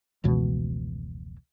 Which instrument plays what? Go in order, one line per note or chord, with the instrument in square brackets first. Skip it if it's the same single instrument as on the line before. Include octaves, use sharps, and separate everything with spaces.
[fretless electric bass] F1 C#2 B2 E3